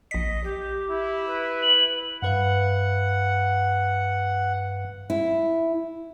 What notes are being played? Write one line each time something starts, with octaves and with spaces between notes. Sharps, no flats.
A#1 D#5 B6
G4
E4
B4
F#7
G2 B4 F5 F#5
E4